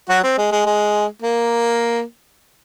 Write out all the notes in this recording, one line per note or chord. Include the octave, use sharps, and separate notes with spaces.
F#3 F#4
C4
G#3
G#3
G#3
A#3